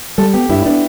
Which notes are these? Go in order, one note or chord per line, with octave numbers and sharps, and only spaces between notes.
G3 A4
B3 G4
G2 E4
B3 D4